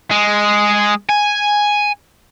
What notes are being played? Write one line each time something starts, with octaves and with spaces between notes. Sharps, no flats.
G#3
G#5